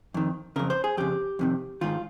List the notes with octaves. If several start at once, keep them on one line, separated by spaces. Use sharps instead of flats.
F2 D#3
F2 C#3 A#4
C5
G#4
F2 C#3 G4
F2 C3 D#3
G#2 D#3 F4